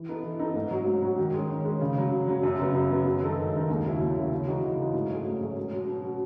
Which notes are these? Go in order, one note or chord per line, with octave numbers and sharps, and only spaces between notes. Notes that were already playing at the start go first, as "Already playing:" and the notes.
Already playing: E3
B3 D#4 A4
E3
B3 D#4 A4
G#2
F#3 C#4 F#4
G#2
F#3 C#4 F#4
D#3
G#3 C#4
D#3
G#3 C#4
C#3
F#3 C#4
C#3
F#3 C#4
F#2
C#3 F#3 B3
F#2
C#3 F#3 B3
F#2
D#3 G#3 D#4 A4
F#2
D#3 G#3 D#4 A4
D#2
C#3 F#3 C#4 E4
D#2
C#3 F#3 C#4 E4
C#3
E3 G#3 D#4 F#4
C#3
E3 G#3 D#4 F#4
G#2
F#3 A3 C#4 G#4
G#2
F#3 A3 C#4 G#4
B2
F#3 C#4 F#4
B2
F#3 C#4 F#4